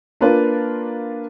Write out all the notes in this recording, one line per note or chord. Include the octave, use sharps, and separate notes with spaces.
A#3 D4 F4 A#4 B4